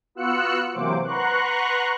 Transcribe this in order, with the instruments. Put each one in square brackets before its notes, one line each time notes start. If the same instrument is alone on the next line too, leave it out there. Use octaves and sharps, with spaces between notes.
[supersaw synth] B3 F4 F#4 E6 F#6 C#7
C3 E3 F#3 A#3 C5 D6
B4 F#5 A#5 C6 C#6 F#6